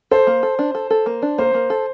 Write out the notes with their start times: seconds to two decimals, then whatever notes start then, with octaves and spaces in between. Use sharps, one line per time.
0.11 A4 C5
0.27 A#3
0.43 A4
0.59 D4
0.75 A4
0.90 A4
1.06 A#3
1.22 D4
1.38 A#3 C5
1.54 A#3
1.70 A4